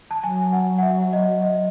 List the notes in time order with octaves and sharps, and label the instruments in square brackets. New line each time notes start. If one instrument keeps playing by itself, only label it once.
[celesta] A5
[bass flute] F#3 [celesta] G#5
[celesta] F#5
F#5
E5
D#5
D#5